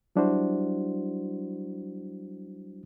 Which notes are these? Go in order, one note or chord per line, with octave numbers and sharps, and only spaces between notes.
F#3 G3 D4 E4 F#4 C5